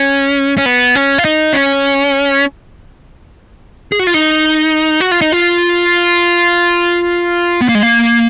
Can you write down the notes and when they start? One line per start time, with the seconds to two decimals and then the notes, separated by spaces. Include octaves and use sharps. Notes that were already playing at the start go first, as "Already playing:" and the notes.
Already playing: C#4
0.58 C#4
0.66 B3
0.95 C#4
1.18 F4
1.25 D#4
1.53 C#4
3.92 G#4
3.99 F#4
4.07 F4
4.14 D#4
5.00 F#4
5.11 F4
5.21 D#4
5.32 F4
7.61 B3
7.69 A#3
7.75 G#3
7.83 A#3